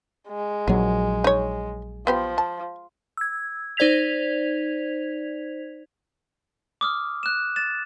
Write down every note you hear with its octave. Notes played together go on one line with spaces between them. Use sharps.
G#3
A#1 F#3 G#4
D#4 C#5
F3 B3 G4 C5
A5
E6 G#6
D#4 C5 D5 G#6 B6 F7
D6 D#6 F6
F#6 E7
A6 E7